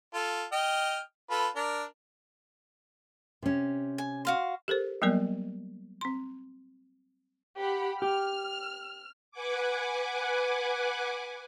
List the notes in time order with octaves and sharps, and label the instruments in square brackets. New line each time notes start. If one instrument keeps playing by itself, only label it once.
[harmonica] F4 A4
D#5 G5 F6
F4 A4 B4
D4 A#4
[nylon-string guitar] C3 C#4
[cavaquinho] G#5
F#4 F5 C6
[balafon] G4 A4 A#4 C5
F#3 G3 A#3 B3 A#4 D5
C4 C6
[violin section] G4 F#5 B5
[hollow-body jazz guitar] G4 [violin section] F6
[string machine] B4 F#5 G#5 D6